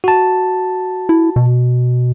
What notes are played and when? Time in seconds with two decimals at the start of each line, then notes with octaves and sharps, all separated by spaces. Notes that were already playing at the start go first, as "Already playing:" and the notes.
0.04 F#4 A5
1.09 E4
1.36 B2